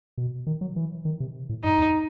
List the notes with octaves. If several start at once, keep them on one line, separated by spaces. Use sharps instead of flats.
B2
D#3
F#3
E3
D#3
C3
A2
G2 D#4
E2